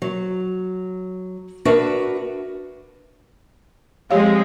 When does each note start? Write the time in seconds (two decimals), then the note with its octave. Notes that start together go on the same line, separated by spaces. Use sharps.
0.02 F#3
1.65 D4 F#4 A#4 B4 E5
4.11 F3 G#3 C4 G4 C#5 F5